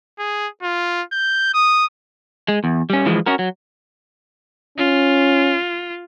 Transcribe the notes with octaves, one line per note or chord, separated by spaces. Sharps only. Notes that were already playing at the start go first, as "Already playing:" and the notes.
G#4
F4
G6
D#6
G#3
E2
G3 C#4
E3 F3 G#3
C#4 F#4 A#4
F#3
C#4 F4